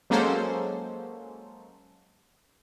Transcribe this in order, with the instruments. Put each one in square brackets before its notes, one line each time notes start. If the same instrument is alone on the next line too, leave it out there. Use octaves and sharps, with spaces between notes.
[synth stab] F#3 G#3 A#3 C#4 A4 C5